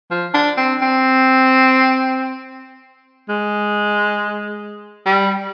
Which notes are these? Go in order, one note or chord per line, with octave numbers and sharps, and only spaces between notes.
F3
D4
C4
C4
G#3
G3